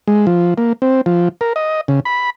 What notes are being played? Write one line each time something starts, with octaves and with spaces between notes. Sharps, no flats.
G#3
F3
A#3
C4
F3
A#4
D#5
C#3
B5